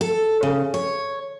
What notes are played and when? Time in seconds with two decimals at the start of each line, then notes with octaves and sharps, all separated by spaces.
0.01 A4
0.43 C#3
0.74 C#5